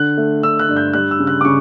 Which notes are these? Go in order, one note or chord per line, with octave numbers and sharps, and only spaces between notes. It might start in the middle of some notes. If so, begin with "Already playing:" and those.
Already playing: D3 F#6
A3
D3 E6
F#6
G2
G6
G3 F#6
E6
C#3
F#6
D6
C#3 C#6